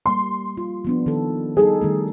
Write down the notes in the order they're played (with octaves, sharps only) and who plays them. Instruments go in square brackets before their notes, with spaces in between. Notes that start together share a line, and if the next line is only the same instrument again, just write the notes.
[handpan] G3 A#3 [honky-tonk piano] C6
[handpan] F4
F3 B3 D4
D#3 A4
[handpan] G3 D#4 A4 [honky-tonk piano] G#4
[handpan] D#3 G3 A3